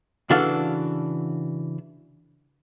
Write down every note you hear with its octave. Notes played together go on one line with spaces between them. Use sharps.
C#3 E3 D4 F#4 A4 F5